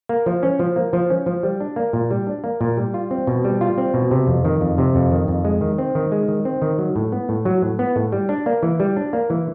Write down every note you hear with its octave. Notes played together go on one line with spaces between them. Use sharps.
A#3
F3
C#4
F3
A#3
F3
C#4
F3
G3
D4
A#3
A#2
G3
D4
A#3
A#2
G3
F4
C4
B2
G3
F4
C4
B2
C3
F2
D#3
F2
C3
F2
D#3
F2
G#3
D#3
C4
D#3
G#3
D#3
C4
D#3
F#3
A2
B3
A2
F#3
A2
B3
A2
G3
D4
A#3
E3
G3
D4
A#3
E3